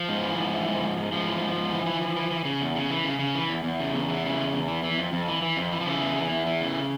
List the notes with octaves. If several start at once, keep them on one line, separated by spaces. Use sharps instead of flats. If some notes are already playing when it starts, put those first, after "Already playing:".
Already playing: F3
G#2
E3
G#2
E3
G#2
G#2
G#2
G#2 F3
E3
G#2
G#2
E3
E3
E3
E3
E3
C#3
E2
C#3
E3
C#3
C#3
E3
E2
E2
C#3
E2
E3
C#3
E2
E2
E3
E3
F2
F2
E3
E3
F2
E3
F3
C#3 E3
E2
E3
E2
E3
C#3